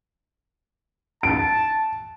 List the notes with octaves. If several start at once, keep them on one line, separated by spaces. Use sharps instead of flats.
A5 D7